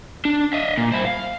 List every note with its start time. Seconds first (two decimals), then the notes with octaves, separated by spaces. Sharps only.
0.25 D4
0.53 D#5 E5
0.77 A#2
0.92 E4 C5
1.07 F5